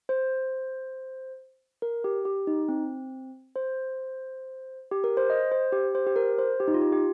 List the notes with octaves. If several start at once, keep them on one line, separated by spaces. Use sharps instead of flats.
C5
A#4
G4
G4
D#4
C4
C5
G4
A#4
C5
D#5
C5
G4
C5
G4
A#4
C5
G4
D#4
F4
G4
G4